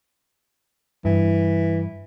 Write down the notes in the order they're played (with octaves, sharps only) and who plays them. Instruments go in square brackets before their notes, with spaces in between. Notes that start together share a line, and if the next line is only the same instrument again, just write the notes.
[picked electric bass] G2 [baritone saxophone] E3